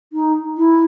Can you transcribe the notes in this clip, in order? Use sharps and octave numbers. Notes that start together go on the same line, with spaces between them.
D#4
E4